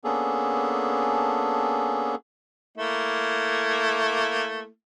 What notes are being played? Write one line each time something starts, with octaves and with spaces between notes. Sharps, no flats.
A#3 B3 C#4 D4 G#4 A4
A3 A#3 E4